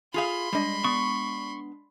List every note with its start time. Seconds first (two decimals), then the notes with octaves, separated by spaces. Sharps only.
0.14 F4 G#4 F5 B5 C6
0.53 G3 G#3 D4 D#5
0.84 B3 C#6